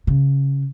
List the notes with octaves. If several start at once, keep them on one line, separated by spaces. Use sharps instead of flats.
C#3